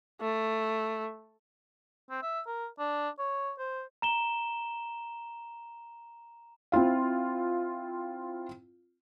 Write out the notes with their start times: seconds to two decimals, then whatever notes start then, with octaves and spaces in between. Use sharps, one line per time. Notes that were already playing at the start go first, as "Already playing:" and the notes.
0.21 A3
2.10 C4
2.22 E5
2.47 A#4
2.79 D4
3.19 C#5
3.59 C5
4.02 A#5 E7 G7
6.72 C4 E4 F4 F5